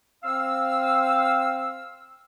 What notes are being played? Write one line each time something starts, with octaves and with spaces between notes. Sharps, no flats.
C4 F5 E6